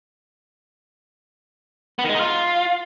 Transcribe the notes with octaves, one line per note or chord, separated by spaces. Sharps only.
B3
D#3
G#3
D#4
F4